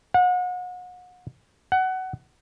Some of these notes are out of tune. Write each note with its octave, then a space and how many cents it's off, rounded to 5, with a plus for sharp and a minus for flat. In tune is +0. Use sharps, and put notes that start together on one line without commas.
F#5 -35
F#5 +20